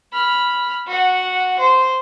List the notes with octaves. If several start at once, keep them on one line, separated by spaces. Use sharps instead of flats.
B5 F6
F#4 F#5
C5